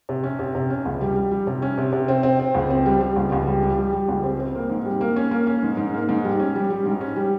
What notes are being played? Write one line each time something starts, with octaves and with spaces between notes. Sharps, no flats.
C3
C#4
C3
C3
C#4
C#2
G3
G3
G3
C3
C#4
C3
C3
C4
C4
C4
C#2
C4
G3
G3
C#2
C#2
G3
G3
G3
G3
C#2
C4
C4
A#3
G#2
G3
A#3
C#4
A#3
C#4
G#2
G#2
A#3
G#2
G3
C#4
G3
G3
G#2
C#4
G3